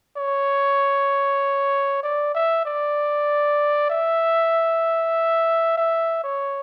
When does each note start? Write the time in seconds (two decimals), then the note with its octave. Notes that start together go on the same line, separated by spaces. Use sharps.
0.17 C#5
2.03 D5
2.35 E5
2.65 D5
3.90 E5
5.77 E5
6.24 C#5